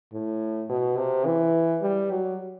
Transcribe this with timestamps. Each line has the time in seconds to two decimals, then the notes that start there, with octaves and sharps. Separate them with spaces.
0.13 A2
0.69 B2
0.97 C3
1.25 E3
1.82 G3
2.11 F#3